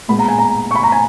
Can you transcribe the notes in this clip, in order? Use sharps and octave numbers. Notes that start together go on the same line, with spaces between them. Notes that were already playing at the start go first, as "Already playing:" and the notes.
A#2 G#3 B3 B5
A#5
G#5
A#5
C#6
B5
A#5
G#5